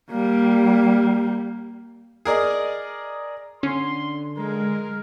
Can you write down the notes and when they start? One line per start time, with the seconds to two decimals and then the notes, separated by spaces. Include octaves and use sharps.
0.11 G3 A#3
2.25 G#4 A#4 D5 D#5
3.63 D3 C#4 C6
4.37 G#3 A#4